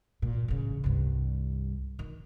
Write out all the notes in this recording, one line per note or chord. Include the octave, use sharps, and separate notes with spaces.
A#2
A1 C#3
C2 G2
D#3